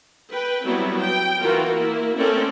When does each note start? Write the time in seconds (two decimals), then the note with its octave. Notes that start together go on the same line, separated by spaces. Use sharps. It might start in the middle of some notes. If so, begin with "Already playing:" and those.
0.32 B4 G5
0.65 F#3 G3 B3 C4 E4
1.01 G5
1.40 E3 F4 F#4 A#4
1.72 A#3 E4
2.17 A3 C4 C#4 A4 A#4 D5